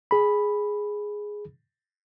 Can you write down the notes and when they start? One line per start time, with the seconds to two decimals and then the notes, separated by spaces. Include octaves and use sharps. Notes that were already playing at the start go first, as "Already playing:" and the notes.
0.11 G#4 B5